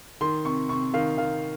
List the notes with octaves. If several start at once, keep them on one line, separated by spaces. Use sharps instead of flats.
D#3 C6
C3 C#6
C3 C#6
D#3 F5
D#3 F5